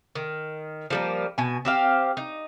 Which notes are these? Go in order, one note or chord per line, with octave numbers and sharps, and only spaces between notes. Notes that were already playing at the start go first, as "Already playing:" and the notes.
D#3
F3 G3 A#3
B2 G#5
C4 G4 F5
D#4